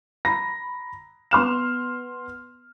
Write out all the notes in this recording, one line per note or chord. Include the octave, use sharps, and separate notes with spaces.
A#5 B5 A#6
B3 C6 F6 E7